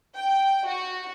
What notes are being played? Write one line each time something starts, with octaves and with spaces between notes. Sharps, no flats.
G5
F#4